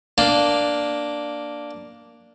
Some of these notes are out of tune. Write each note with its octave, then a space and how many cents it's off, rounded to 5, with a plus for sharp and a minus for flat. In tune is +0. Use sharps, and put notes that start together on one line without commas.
A#3 +0 D4 +0